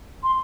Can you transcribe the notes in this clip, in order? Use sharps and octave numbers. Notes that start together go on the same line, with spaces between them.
C6